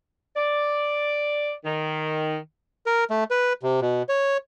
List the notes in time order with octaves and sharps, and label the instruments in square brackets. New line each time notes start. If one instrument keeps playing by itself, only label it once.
[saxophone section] D5
D#3
[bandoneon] A#4
A3
B4
C3
B2
C#5